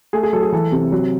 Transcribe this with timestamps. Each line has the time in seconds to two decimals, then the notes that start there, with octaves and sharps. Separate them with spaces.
0.13 A3 G#4
0.23 G#4
0.33 F#3 A4
0.43 G#4
0.52 E3 A4
0.72 C3
0.92 F#3